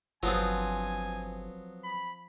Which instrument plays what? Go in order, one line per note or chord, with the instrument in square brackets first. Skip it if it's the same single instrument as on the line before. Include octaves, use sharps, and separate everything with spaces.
[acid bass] G1 [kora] F3 C4 [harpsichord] F#3 B3 G#4 [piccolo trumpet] G#5
[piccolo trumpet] B5